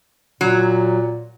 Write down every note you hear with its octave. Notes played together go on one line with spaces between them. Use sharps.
A#2 F#3